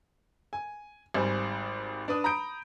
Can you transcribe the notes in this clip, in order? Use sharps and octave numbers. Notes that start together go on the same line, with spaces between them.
G#5
G#1 G3 C5 G#5
D4 B4 D#6
A#5 B5 D#6 G6 D7